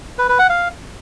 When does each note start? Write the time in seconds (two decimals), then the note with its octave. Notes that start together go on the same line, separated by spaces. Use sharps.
0.18 B4
0.29 B4
0.39 F#5
0.49 F5